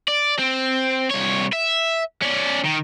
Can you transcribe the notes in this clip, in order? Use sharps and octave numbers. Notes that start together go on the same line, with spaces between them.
D5
C4
C2 C#5
E5
C#4 D5
D#3